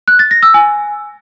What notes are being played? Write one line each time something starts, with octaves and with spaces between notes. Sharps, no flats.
F#6
A6
A#6
E6
G#5